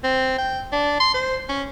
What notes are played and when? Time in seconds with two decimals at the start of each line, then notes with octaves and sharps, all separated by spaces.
0.04 C4
0.38 G5
0.73 D4
1.00 C6
1.14 C5
1.49 C#4